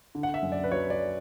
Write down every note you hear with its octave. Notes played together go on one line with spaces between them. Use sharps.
D3
F#5
E5
F#2
D5
B4
F#3 C#5
D5